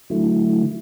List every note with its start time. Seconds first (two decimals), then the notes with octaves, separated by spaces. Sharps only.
0.10 D3 F#3 A3 E4